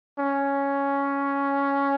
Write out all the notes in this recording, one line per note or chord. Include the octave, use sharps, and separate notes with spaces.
C#4